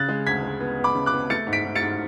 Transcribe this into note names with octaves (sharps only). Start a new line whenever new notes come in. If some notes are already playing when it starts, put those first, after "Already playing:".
Already playing: C#3 F#6 A6
G#3
D2 G#6 B6
G#3
B3
B3
B5 D6
C#3
D6 F#6
B3
A3 A6 C#7
G#2
B6 D7
G#2
A6 C#7
G#2